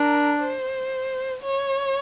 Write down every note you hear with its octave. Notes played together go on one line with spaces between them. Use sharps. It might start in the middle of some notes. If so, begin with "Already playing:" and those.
Already playing: D4 A#4
C5
C#5